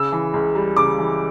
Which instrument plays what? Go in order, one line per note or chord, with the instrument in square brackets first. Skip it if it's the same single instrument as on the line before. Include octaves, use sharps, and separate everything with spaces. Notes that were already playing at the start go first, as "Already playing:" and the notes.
Already playing: [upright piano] C#3 E6
E3
C#2
G3
C#3 D6
E3